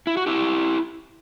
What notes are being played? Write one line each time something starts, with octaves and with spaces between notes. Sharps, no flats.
E4
F#4
E4 G4